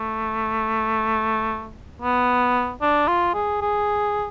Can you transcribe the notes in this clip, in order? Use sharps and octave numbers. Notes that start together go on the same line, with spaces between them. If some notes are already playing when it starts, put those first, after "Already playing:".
Already playing: A3
B3
D4
F4
G#4
G#4